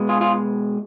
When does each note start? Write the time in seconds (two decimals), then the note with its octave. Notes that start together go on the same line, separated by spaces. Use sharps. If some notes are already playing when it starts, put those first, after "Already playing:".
Already playing: B2 G#3
0.09 F4 G#4
0.21 F4 G#4